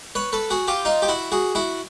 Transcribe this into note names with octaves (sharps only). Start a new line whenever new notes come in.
B4 C#5
A4 B4
F#4 G#4
F4 G4
D#4 F4
G4
E4 F#4
F#4 G#4
E4 F#4